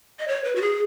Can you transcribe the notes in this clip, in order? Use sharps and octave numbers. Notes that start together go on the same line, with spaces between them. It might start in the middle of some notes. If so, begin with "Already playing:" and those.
D#5
C#5
B4
F#4
G#4